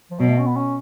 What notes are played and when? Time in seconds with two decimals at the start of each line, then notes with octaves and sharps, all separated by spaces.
0.11 F3
0.19 B2 F#3
0.29 A3
0.38 C#4
0.46 B3
0.56 C#4